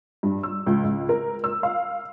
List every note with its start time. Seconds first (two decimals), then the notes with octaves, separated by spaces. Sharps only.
0.23 G2
0.43 E6
0.66 C#2
0.84 C#2
1.09 A#4
1.44 E6
1.63 F5